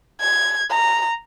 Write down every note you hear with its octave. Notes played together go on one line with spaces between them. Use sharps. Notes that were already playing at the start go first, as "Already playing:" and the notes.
G#6
A#5